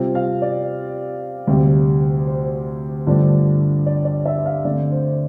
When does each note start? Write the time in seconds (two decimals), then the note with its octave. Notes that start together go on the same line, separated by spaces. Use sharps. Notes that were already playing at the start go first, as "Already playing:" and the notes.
Already playing: C3 G3 C4 F4
0.15 F5
0.42 D5
1.47 D2 C3 G3
2.27 C5
3.07 G2 D3 F3 A3 D4
3.86 D5
4.05 D5
4.26 E5
4.46 F5
4.65 D3 A3 C4 D5
4.92 C5